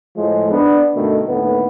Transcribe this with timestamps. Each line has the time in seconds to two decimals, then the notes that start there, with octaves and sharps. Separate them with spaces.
0.16 A2 F3 G#3
0.51 B3 D4
0.95 G2 B2 D3 D#3 A3
1.27 D#2 A2 D3 B3